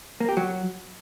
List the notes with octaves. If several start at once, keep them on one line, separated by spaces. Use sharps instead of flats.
A#3
G4
F#3